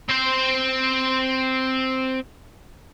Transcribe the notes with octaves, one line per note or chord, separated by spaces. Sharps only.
C4 C5